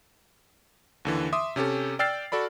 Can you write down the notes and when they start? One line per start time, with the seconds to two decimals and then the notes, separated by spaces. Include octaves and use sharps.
1.05 D#2 D3 E3
1.33 E5 C6 D6 D#6
1.56 C3 C#4 G4 A4
1.99 D5 G5 E6 F6 A6 C7
2.32 F#4 A4 D5 B5